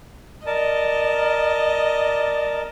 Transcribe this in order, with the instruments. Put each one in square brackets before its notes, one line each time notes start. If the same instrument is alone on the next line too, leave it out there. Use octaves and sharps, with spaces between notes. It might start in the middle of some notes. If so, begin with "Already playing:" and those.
[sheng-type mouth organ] A#4 A5 [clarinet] D5 [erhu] D#5